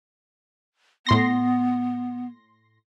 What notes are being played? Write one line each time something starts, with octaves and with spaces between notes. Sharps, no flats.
A2 B3 C6 A#6